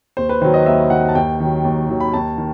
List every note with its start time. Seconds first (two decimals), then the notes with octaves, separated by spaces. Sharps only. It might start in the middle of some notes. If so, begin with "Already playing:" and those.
0.17 D#2 C5
0.29 B4
0.42 D#3 F#3 C5
0.54 D#5
0.66 D#2 E5
0.90 D#3 F#3 F#5
1.09 A5
1.15 D#2 G5
1.40 D#3 F#3
1.65 D#2
1.89 D#3 F#3
2.00 B5
2.13 D#2 A5
2.38 D#3